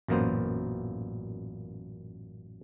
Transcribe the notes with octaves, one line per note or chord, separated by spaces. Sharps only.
A1 F#2 A#2 A#3 B3 C5